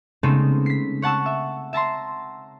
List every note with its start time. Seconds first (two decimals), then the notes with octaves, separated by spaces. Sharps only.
0.23 C#3 G#3 A3 B3 C4 D#4
0.66 B6 C7
1.02 C#5 F#5 A5 C#6 E6
1.26 E5
1.73 E5 A5 A#5 C6